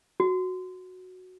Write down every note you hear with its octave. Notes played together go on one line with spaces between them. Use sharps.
F#4